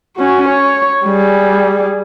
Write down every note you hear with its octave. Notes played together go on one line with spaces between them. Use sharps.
C#4 F#4
C#5
G3 G#4